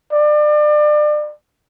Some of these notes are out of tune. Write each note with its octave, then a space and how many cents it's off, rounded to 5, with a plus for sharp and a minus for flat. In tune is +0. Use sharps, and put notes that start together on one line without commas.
D5 +30